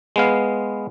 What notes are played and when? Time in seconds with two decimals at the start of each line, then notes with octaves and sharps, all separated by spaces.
0.16 G#3 B3 F5